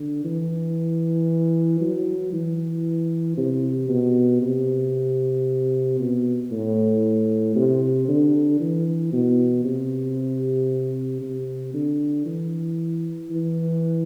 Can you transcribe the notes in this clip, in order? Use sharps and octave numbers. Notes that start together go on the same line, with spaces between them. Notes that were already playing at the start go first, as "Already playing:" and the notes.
Already playing: D3
E3
F#3
E3
C3
B2
C3
B2
A2
C3
D3
E3
B2
C3
C3
D3
E3
E3